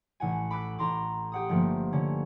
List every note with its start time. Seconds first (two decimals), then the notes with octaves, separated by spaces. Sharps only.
0.20 A1 F#5 G#5
0.51 B5 D6 E6 F#6 B6
0.79 A1 A#5 C6 D6
1.32 G4 F#5 D#6
1.49 G1 F3 A3 A#3
1.93 D3 C#4